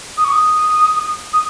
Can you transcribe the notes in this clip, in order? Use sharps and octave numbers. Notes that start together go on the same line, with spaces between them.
D#6
C#6
D#6
D#6